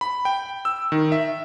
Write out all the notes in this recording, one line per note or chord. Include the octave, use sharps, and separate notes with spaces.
B5
G5
E6
D#3
E5